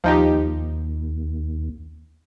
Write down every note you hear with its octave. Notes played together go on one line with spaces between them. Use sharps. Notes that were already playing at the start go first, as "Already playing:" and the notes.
D#2 F3 D#4 G4